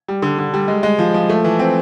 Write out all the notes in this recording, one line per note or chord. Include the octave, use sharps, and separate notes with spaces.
G3
D3
D3
G3
G#3
G#3
F3
F3
A3
E3
C4